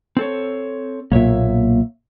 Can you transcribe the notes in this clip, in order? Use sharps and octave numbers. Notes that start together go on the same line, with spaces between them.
C4 A4 C#5
B1 A#2 A#3 C#5 E5